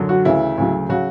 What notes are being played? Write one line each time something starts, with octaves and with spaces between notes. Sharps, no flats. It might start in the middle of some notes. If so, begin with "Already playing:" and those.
Already playing: F#2 D3 F#3
F#4
D2 C#3 E3 E4
D2 C#3 F#3
C#3 F#3 F#4